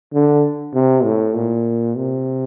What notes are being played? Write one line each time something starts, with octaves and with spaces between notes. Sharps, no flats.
D3
C3
A2
A#2
C3